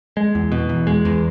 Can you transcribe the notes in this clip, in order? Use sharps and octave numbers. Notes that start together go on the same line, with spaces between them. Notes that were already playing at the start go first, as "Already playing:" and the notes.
G#3
E2
B2
E2
G#3
E2